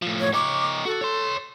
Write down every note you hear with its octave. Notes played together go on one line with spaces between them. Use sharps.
A2 F3
C#5
D#4 C#5 D6
F#4 A4
C#5 C6